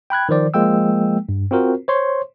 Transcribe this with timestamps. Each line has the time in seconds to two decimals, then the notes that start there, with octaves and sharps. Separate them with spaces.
0.10 G5 B5 F#6 G#6
0.29 D#3 F3 C5 D5
0.54 F3 G#3 A#3 G5 E6
1.29 G2
1.51 C4 F4 F#4 A#4 C5
1.88 C5 C#5 C6